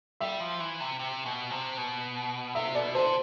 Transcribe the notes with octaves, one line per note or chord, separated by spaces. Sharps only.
G3 E5
F3
E3
C3
C3
B2
C3
B2
C3 E5
B2 D5
D3 C5